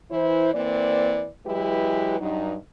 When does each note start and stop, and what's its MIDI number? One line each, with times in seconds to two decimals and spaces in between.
0.11 0.51 52
0.11 0.51 64
0.11 0.51 72
0.54 1.28 52
0.54 1.28 58
0.54 1.28 60
0.54 1.28 74
1.47 2.20 52
1.47 2.20 54
1.47 2.20 56
1.47 2.20 64
1.47 2.20 67
1.47 2.20 71
2.20 2.56 43
2.20 2.56 54
2.20 2.56 63